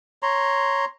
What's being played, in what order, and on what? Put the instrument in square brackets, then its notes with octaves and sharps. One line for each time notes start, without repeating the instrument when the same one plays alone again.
[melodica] C#5 A#5 C6